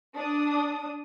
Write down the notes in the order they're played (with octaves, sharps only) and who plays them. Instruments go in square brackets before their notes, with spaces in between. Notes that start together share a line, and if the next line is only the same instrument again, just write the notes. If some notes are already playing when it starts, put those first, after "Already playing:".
[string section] D4 D#6